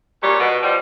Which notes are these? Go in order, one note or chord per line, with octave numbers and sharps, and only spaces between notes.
A#2 G3 C#5
B2
F3 G3